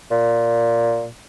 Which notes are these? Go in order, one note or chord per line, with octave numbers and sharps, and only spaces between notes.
A#2